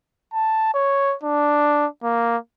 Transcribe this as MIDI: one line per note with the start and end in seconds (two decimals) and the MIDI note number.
0.34 0.70 81
0.74 1.16 73
1.23 1.87 62
2.04 2.37 58